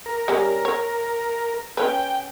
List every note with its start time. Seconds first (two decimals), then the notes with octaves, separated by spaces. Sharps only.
0.06 A#4
0.28 G3 C#4
0.65 C#5
1.77 C#4 B4 G5